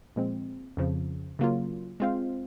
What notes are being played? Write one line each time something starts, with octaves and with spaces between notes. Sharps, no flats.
A#2 F3 G#3 C4
F2 C#3 F3
C#3 F#3 A#3 F4
G#3 C4 F4 C5 F5